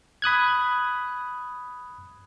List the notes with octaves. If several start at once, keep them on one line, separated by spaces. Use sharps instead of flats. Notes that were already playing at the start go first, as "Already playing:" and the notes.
B5 D#6 F#6 G#6